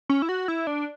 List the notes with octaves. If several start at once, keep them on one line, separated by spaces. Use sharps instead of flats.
C#4
E4
F#4
E4
D4